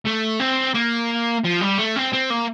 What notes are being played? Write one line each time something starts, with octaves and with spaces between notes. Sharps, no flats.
A3
C4
A#3
F3
G3
A3
C4
C4
A#3